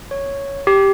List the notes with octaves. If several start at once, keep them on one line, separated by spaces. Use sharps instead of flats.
C#5
G4